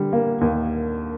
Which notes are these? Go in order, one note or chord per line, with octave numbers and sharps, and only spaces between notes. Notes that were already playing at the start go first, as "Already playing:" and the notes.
Already playing: D3 G3
A#3
D#2